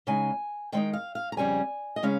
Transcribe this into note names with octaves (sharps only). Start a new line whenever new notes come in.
C#3 G#3 D#4 G#5
D#3 G#3 C4 D#4 G5
F5
F5
A#5
F2 C#3 G3 C#4 G#5
D#5
C#3 G#3 C#4 F5